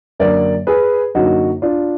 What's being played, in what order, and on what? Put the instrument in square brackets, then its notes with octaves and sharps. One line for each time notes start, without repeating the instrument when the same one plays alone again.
[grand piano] F#2 D3 F#3 A#3 A#4 D5
G#4 B4
F#2 D3 F#3 A#3 D#4 F#4
D4 F4